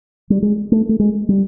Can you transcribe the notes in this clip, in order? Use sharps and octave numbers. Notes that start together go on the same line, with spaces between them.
G3
G#3
A3
A3
G#3
G3